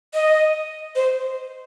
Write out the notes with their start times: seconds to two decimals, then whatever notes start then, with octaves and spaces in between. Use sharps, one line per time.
0.14 D#5
0.95 C5